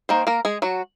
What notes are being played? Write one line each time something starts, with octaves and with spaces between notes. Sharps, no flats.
D#3 A#3 C5
A#3 A#4
G#3 G#4
F#3 F#4